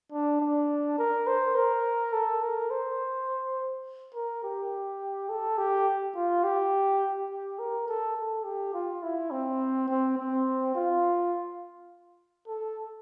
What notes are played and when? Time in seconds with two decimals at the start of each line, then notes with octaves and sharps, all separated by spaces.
0.12 D4
0.41 D4
0.98 A#4
1.27 C5
1.56 A#4
2.13 A4
2.42 A#4
2.70 C5
4.14 A#4
4.43 G4
5.29 A4
5.58 G4
6.15 F4
6.44 G4
7.30 G4
7.59 A#4
7.88 A4
8.16 A4
8.45 G4
8.74 F4
9.02 E4
9.31 C4
9.89 C4
10.18 C4
10.75 F4
12.47 A4